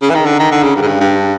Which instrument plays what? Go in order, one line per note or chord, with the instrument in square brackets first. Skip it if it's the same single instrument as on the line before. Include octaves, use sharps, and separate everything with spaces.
[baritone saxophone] C#3
E3
D#3
D3
D#3
D3
C#3
G2
G#2
G2
G2